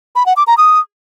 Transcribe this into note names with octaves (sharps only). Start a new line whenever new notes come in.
B5
F#5
D6
A#5
D#6